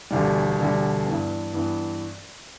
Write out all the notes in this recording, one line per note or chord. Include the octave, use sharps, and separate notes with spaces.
E1 D2 D3 G3
E1 D2 D3 G3
G2 E3 B3
G2 E3 B3